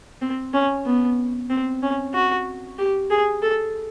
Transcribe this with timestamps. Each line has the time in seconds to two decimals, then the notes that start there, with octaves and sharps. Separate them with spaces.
0.21 C4
0.53 C#4
0.86 B3
1.50 C4
1.82 C#4
2.14 F#4
2.79 G4
3.10 G#4
3.42 A4